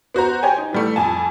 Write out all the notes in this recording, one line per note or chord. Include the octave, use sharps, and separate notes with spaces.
B3 F#4 C5 A#5
G4 C5 C#5 G5 G#5
D#4
E3 G3 A3
F2 G#5 A5